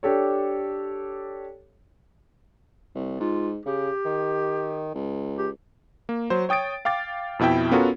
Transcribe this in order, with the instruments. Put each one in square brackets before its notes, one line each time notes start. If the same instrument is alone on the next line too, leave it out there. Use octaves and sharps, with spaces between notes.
[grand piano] D4 G4 A4 C#5
[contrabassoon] C2
[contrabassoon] G#2 [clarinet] F4
[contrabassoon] C#3 [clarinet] G4
[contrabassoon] D#3
C#2
[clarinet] G4
[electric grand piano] A#3
F#3 C5
C#5 G5 D#6 A6 D7
F5 G5 D6 A6
F2 B2 E4 E5 G5
B3 C#4 F4 F#4 A4 A#4